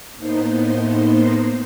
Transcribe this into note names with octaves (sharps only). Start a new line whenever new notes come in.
A2 A#3 B3 D#4 C5 C6